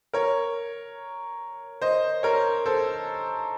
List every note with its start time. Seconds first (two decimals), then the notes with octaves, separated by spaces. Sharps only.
0.14 A#4 C#5
1.82 C5 D#5
2.23 A#4 C#5
2.66 A4 C5